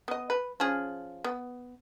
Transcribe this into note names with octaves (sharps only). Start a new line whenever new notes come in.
B3 D#5
B4
F3 C#4 G#4
B3